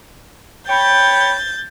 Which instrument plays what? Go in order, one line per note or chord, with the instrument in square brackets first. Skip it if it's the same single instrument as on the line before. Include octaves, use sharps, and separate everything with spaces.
[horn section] C#5 G5 B5 [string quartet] G6 A6